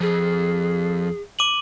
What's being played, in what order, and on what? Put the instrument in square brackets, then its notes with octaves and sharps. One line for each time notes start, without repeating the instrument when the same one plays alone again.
[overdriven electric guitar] F2 [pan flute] G#4
[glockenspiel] D6 D#7 F#7